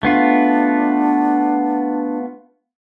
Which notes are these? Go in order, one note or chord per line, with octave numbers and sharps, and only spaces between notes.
A3 B3 D4 F4